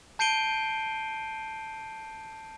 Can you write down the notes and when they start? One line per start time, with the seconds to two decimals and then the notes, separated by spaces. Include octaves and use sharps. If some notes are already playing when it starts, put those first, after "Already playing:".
0.19 A5 G6 C7 D7 D#7 G7